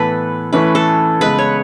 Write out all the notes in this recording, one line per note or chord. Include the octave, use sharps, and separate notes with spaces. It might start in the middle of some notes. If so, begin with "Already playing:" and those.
Already playing: A2 E3 B3 A4 B4
E3 A3 C#4 E4 B4
A4
C#3 G#3 B3 B4
C#5